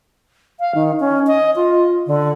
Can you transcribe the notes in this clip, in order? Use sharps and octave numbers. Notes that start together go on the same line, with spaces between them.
F5
D#3
C#4
D#5
F4
D3